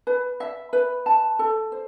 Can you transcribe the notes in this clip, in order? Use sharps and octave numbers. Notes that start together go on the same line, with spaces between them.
B4
E5
B4
A5
A4
C5